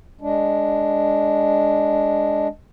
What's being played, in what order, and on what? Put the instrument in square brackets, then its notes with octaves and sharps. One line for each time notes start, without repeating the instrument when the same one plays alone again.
[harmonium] G#3 D4